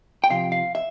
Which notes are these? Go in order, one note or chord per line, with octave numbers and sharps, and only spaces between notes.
G5
C3 F3 F5
F5
E5